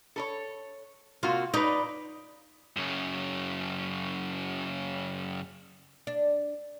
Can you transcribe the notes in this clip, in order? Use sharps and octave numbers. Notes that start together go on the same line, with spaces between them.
A4 A#4 C#5
C3 A#3 F4 F#4
D#4 B4 D5
F#2 C#3
D4